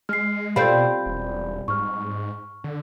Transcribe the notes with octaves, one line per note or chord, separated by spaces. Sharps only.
G#3 F6 C7
B2 G3 C4 F4 A4 F5 B5 G6
E1
G#2 C#6 F6
D3